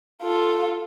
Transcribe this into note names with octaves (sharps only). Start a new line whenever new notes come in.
F4 A4